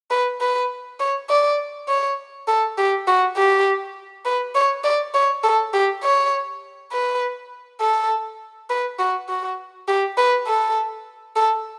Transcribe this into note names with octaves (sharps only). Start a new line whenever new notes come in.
B4
B4
C#5
D5
C#5
A4
G4
F#4
G4
B4
C#5
D5
C#5
A4
G4
C#5
B4
A4
B4
F#4
F#4
G4
B4
A4
A4